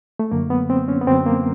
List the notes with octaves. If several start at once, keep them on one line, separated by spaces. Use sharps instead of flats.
A3
F#2 D3 F#3 A#3
B3
C4
C#4
B3
F#2 D3 F#3 C4
A#3